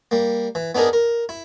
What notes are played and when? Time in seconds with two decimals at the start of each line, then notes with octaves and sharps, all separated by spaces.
0.11 G3 A#3
0.55 E3
0.75 B3 D4 D#4 G#4 A#4
0.93 A#4
1.29 E4